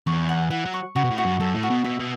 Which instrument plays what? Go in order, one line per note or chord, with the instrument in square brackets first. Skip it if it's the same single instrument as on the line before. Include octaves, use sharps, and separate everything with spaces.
[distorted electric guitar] E2 [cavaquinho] C#6
[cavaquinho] F#5
[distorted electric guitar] E3 [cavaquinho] F#5
[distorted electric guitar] F#3
[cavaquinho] C#6
[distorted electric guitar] C#3 [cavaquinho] F#4
[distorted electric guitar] B2
A2
[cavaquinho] F#4
[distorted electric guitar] F#2
[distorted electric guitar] F#2 [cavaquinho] A4
[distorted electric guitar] A2
[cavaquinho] F#4
[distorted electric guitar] B2
[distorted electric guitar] B2 [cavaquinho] E5
[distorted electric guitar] B2